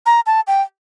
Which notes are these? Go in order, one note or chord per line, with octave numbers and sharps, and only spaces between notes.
A#5
A5
G5